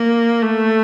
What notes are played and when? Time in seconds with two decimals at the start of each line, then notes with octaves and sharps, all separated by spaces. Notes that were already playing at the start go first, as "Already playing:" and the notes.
Already playing: A#3
0.42 A3